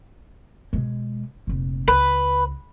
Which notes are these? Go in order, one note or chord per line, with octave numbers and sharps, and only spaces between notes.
B2 G#3
F1 A#2
C#2 B4